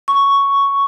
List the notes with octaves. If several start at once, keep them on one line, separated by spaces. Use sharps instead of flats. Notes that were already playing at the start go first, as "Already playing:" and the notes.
C#6